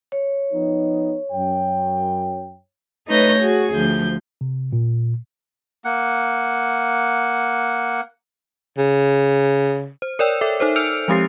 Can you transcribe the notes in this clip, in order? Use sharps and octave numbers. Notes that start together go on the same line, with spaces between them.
C#5
F3 B3 D#4
F#2 G5
A3 D#4 B4 C#5 G6 A#6
F#4 G#4
D2 F3 G6
C3
A#2
A#3 F#5
C#3
C5
A#4 C#5 D5 G5 E6
A4 E5
D#4 A4 C5
E6 F6 G6 C#7 D7 F7
F3 G#3 C4 G4 A6 C7